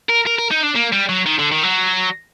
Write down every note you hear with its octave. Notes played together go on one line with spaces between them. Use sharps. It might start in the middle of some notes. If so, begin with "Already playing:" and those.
A#4
A#4
A#4
D#4
D4
A#3
G3
F#3
D#3
D3
D#3
F#3